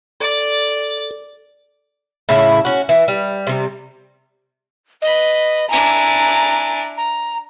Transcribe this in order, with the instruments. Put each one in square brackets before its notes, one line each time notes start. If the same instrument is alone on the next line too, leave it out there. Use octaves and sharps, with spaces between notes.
[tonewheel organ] A4 [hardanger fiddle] D5
[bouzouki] A2 C#3 E4
C#4 F#4
E3
G3
C3 G3
[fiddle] B4 B5 [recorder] D#5
[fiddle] D4 E4 [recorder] G#5 [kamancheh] A#5
[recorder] A#5